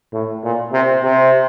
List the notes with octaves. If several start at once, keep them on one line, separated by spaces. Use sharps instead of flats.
A2
A#2
C3
C3